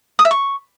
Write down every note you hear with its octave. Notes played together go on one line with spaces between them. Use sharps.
D#6
E5
C#6